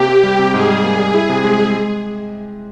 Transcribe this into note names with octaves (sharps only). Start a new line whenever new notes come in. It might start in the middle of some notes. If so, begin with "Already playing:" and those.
Already playing: C3 A#3 G4
C4
G3
C3
G#2 G#4
G3
A#3
G3
E4
C3
G#3
G#3
G#3